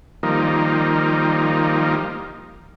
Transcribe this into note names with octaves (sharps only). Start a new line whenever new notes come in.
D#3 F3 G3 A#3 D#4